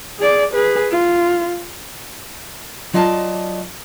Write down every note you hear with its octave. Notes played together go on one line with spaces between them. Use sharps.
G#4 D5
G#4 B4
F4
F#3 F4 D5 D#5 G5 A5